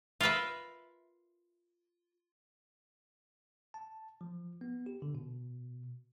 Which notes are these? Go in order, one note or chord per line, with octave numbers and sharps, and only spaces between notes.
F4 A#4 B4 E5
A5
F3
B3
G4
D3
B2